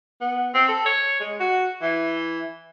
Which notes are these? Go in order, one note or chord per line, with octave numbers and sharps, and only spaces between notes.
B3
C4
A4
C#5
G#3
F#4
E3